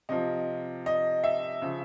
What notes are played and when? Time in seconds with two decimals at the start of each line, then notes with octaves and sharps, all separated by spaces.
0.09 C3 F3 D#5
0.86 D#5
1.24 E5
1.62 C#3 F3